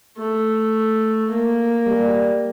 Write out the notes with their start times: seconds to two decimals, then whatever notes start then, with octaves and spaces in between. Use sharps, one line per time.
0.17 A3
1.31 A#3
1.87 G3